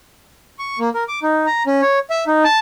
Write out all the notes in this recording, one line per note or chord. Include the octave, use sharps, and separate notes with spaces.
C#6
A#3
A#4
D6
D#4
A#5
C#4
C#5
E5
D#4
A5